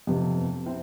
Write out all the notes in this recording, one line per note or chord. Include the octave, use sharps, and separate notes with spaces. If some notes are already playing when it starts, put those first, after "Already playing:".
F2 C3 B3
C4 E4